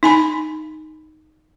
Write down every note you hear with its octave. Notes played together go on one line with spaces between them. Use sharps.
D#4 G#5 B5